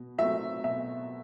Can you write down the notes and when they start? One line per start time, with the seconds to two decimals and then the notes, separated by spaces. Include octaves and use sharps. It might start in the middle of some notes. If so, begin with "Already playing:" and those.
Already playing: B2
0.18 F#3 A3 C4 E5
0.64 B2 E5